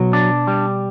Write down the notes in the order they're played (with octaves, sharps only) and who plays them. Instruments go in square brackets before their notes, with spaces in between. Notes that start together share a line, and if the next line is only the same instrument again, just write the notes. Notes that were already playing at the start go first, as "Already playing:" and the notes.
Already playing: [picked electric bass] B2 [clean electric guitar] F#3
[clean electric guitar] D4
G3